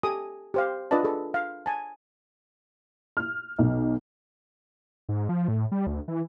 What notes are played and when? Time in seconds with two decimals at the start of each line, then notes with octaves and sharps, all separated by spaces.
0.03 G4 A4 G#5 D#6
0.54 G4 C5 F5
0.91 D4 F4 B4 D5 D#5 A5
1.03 G#4 A4
1.34 F5
1.66 G#5 A5
3.17 F6
3.59 B1
5.09 G#2
5.29 F3
5.48 A2
5.72 G3
5.87 D2
6.08 E3